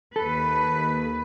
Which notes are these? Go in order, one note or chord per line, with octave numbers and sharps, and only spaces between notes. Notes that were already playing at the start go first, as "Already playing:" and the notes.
D#2 A4 B4